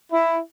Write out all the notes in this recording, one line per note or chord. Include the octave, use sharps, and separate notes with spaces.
E4